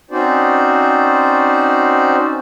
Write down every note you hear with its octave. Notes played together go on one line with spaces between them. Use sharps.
C4 C#4 D#4 F#4 C5 D5